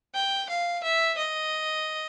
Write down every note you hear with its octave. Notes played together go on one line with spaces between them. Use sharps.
G5
F5
E5
D#5